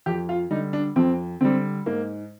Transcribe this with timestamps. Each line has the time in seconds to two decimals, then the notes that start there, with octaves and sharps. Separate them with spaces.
0.06 F2 G4
0.29 F4
0.51 D3 G3 D#4
0.73 D4
0.96 F2 C4
1.41 D3 G3 C4
1.86 G#2 A#3